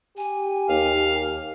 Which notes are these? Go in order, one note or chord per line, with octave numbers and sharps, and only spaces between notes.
G4 G#5
D#2 F5